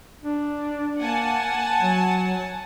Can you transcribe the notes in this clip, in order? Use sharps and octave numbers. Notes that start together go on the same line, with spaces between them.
D4
A#3 F#5 G#5 A5
F#3